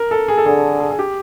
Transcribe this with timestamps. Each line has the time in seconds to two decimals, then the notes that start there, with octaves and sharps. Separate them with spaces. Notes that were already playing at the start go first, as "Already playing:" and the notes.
Already playing: A#4
0.11 A4
0.28 G#4
0.38 A4
0.46 D3 G#4
0.80 G#4
0.91 G#4
0.99 G4